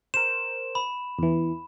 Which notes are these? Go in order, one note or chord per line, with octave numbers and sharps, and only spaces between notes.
A#4 C5 E7
B5
E2 E3